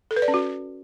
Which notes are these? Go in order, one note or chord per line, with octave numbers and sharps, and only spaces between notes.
A4
B4
D5
C#4
F#4